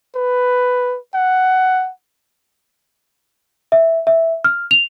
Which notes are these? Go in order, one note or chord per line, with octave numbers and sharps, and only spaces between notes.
B4
F#5
E5
E5
F6
F7